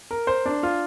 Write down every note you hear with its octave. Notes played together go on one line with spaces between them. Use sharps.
A#4
C5
D4
F4